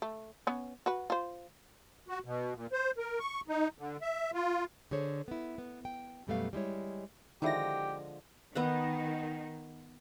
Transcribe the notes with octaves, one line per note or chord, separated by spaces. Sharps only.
A3
B3 C#4
F#4 B4
F4 C5
F#4
B2
A#2
C5
A#4
C#6
D#4
D3
E5
F4
D3 G#4 C5 C#5
B3 E4
B3
G5
F#2 B2 G3 A3 B3 F5
G3 G#3 E4 C#5
D3 D#3 F3 G#3 E4 G4 A#6
D#3 B3 D#4 D#5 F#5